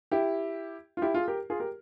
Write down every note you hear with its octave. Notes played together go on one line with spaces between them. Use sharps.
E4 G4
F4
E4 G4
F4 G#4
G4 A#4
F4 G#4
G4 A#4